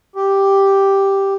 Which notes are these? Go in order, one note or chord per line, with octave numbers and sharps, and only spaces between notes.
G4